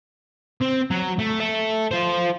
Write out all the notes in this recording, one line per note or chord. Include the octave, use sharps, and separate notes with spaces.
C4
F#3
A3
A4 E5
F4 C5